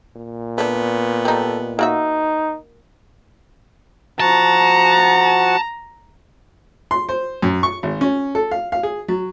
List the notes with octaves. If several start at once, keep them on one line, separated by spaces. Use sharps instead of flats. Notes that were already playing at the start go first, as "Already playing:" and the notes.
A#2
A3 B3 D4
G3 D#4 A4
A#3 D#4 F#4 E5
F3 F#4 F#5 A5 A#5
C6
C5
F#2
C#6
G#1
C#4
A4
F5
F5
G#4
F#3